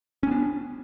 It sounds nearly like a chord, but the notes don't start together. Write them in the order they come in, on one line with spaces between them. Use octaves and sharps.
C#4 B3 D4